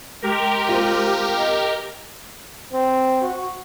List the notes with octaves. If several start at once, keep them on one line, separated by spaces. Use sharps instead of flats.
G#3 G4 A#4
C4 F4
D#5
C4
F#4